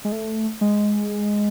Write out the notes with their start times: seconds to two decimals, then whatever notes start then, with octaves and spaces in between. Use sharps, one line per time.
0.05 G#3
0.12 A3
0.61 G#3